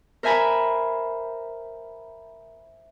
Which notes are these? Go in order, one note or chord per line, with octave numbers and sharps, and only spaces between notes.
A#4 C5 E5 G#5 A#5 B5